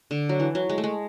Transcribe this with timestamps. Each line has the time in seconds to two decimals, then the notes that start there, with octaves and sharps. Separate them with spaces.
0.11 D3
0.29 F#3
0.40 E3
0.55 F#3
0.69 G#3
0.78 A3
0.84 G#3